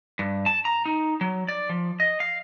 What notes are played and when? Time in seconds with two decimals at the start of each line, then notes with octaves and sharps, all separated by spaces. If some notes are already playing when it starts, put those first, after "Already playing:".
0.19 G2
0.46 A5
0.65 A#5
0.86 D#4
1.21 F#3
1.48 D5
1.69 F3
2.00 D#5
2.20 F5